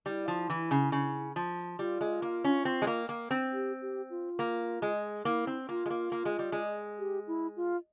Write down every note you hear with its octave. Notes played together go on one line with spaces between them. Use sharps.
G3 E4
F3
E3
C#3
C#3
F3
G3 F4
G#3
A#3
C#4
C4
G#3
A#3
A#3
C4
G4
G4
F4
A#3
G#3
A#3 E4
C4
A#3 F4
G#3
A#3
A#3
G#3
G3
G#3
G4
E4
F4